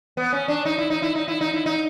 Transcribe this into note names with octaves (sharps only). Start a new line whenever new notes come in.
B3
C#4
D4
D#4
E4
D#4
E4
D#4
E4
D#4
E4
D#4